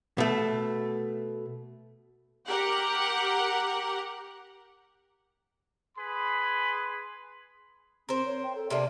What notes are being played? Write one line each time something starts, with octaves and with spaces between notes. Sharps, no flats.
B2 A3
G4 A#4 F#5
G#4 B4 B5 C6
C4 A#4 C5
C#5
G5
A4
C3 A#3 D4 E5